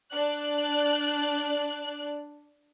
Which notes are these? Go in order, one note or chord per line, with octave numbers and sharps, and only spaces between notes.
D4 D5 F#6